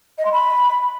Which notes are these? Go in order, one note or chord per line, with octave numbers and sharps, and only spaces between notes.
D#5
C6
B5